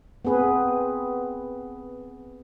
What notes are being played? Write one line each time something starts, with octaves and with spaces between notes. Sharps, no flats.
B3 C4 G#4 B4